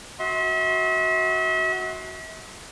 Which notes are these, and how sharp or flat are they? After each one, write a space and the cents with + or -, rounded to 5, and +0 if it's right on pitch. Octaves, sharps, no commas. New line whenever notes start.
F#4 +0 E5 -40 C6 +15